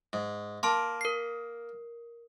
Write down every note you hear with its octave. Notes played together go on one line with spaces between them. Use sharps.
G#2
A#3 A5 C6
A#4 C7